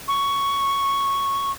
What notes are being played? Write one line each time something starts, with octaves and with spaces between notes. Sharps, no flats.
C#6